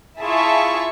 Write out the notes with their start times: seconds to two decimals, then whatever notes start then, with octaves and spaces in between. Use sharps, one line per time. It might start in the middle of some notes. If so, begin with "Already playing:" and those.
0.23 E4 F4 G#4 E5 A5 C#6